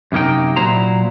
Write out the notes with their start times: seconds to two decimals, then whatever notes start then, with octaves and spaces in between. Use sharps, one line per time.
0.12 F#2 C3 A#3 D#4 G5
0.56 A#2 F#3 E4 C5 A#5